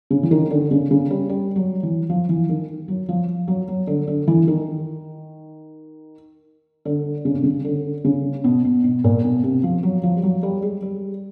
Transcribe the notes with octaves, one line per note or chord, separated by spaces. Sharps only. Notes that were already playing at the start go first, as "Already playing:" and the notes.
C#3
E3
D#3
D3
C#3
C#3
G3
G3
F#3
E3
F3
E3
D#3
F#3
F3
F#3
F#3
D3
D3
E3
D#3
D3
C#3
C3
C#3
D3
C#3
B2
B2
B2
A#2
B2
C3
F3
F#3
F3
G3
F#3
G3
G#3
G3